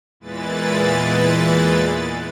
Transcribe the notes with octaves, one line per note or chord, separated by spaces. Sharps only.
E2 A#2 E3 G#3 B4 A6